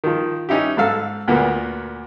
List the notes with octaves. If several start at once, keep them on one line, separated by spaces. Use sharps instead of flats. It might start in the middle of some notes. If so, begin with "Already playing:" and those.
D#3 F3
C#4 D#4 E4 G4
G#2 A4 F5 E6
D2 A#2 A#3 B3